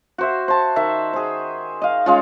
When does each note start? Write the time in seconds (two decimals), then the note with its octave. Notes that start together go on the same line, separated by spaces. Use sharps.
0.18 F#4 C5 E5
0.48 C5 A5
0.76 D#3 E5
1.13 G#4 C5
1.81 D#5 F5
2.06 G#3 C#4 F4